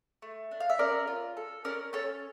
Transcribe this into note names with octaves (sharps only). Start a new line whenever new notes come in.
A3
D4
F5
E5
C#4 A#4 D5
F4
A4
C#4 A#4 D5
C#4 A4 C#5